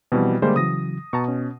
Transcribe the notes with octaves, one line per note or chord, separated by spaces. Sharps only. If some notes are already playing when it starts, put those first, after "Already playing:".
B2 E3 F3 G3 C4 F#4
D3 G3 G#3 A#3 C5
C#3 E3 F#3 D#6 A#6
B2 A5 A#5 C#6
C#4